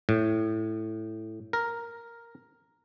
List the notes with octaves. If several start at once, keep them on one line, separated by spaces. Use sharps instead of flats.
A2
A#4